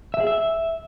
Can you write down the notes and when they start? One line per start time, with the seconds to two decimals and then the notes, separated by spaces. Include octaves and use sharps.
0.14 E5
0.20 G#4
0.27 E5